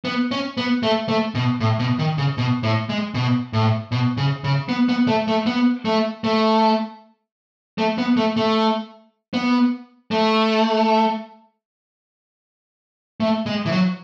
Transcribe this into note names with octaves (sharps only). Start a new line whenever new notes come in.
B3
C#4
B3
A3
A3
B2
A2
B2
D#3
C#3
B2
A2
G#3
B2
A2
B2
C#3
C#3
B3
B3
A3
A3
B3
A3
A3
A3
B3
A3
A3
B3
A3
A3
G#3
E3
F#3